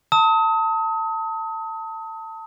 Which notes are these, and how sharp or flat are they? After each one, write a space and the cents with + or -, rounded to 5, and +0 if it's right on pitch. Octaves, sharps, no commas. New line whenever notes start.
A5 +25 D#6 +35